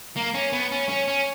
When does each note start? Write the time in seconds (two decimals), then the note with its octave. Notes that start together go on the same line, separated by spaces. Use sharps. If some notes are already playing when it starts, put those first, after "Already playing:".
0.16 A#3
0.34 C#4
0.53 B3
0.72 C#4
0.89 C#4
1.08 C#4